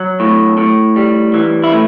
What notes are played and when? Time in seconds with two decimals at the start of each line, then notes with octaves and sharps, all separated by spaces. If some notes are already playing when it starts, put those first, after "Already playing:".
Already playing: F#3
0.20 A2
0.58 A2
0.96 G3
1.34 E3
1.64 E4
1.72 A2